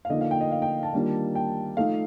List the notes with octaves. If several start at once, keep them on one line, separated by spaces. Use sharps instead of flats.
F5
D3 F3 A#3 D#4 D#5
F5
G5
D#5
F5
G5
A5
D#3 G3 A#3 D4 F4
G5
F3 A3 D#4 F5